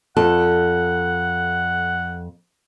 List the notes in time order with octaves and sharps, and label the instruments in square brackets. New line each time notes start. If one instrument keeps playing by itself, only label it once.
[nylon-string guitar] F2 A4 [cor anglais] F#5